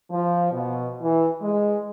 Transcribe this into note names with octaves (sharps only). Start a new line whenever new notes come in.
F3
B2
E3
G#3